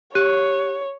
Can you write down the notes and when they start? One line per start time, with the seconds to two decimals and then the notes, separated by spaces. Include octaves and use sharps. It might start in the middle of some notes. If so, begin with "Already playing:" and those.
0.15 G4 C#5 F#6 D#7